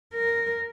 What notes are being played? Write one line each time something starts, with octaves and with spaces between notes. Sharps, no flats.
A#4